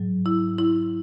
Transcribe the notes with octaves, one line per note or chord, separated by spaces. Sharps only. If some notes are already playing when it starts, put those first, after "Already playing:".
Already playing: G#2 F#3
E4
E4